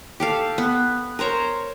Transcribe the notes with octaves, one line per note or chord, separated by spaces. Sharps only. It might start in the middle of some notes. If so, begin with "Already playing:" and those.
G4 A4 F5
B3
A#4 C5 C#5 A#5